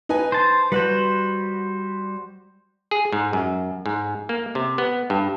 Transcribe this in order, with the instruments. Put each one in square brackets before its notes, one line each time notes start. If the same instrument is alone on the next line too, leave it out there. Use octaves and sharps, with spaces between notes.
[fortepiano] D#4 B4 G#5
[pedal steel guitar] C5 A5
[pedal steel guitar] G3 F#4 C5 [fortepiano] B4
[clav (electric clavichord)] G#4
G#2
F#2
G#2
A#3
C3
B3
G2